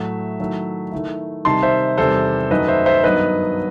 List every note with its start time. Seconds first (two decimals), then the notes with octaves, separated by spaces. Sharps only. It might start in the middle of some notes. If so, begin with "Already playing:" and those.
Already playing: A2 F#3 A3 E5
0.40 D#3 F#3 A3 E4
0.92 D#3 A3 E4
1.45 C3 D#3 G3 D#4 A5 C6
1.63 C5 E5
1.98 E2 C3 D#3 G3 A4 C5
2.51 F#2 D#3 F#3 A3 D#4 B4 D#5
2.68 C5 E5
2.86 C5 E5
3.04 G2 D#3 F#3 B3 D#4 B4 D#5